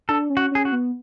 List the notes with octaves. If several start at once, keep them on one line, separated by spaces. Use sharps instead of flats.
D4 A4
C#4
F#4
C#4 G#4
F#4
B3